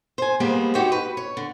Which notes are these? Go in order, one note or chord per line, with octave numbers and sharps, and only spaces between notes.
C5 G#5
G3 G#3 A#3 B3 G4 C5
D#4 F#4 G4 C5 C#5
B4
C#5
D3